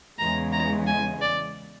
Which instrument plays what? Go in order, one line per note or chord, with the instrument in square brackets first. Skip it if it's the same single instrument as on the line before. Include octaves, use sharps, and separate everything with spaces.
[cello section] E2 C#3 E3 G#3 [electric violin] A#5
[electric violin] A#5
G#5
D5